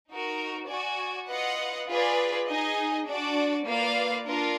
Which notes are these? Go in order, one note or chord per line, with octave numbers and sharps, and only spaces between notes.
D#4 F#4 A#4
F#4 D5 G#5
F4 B4 D#5 F#5
F4 G#4 B4 D5
D#4 G#4 D#5 G#5
D4 F#4 D5
A#3 F4 B4 D5 F5
D4 F4 A#4